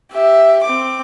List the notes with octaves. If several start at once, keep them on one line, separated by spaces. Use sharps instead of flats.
G4 E5
C4 D6